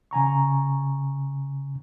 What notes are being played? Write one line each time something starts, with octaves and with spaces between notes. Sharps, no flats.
C#3 G#5 A#5 C#6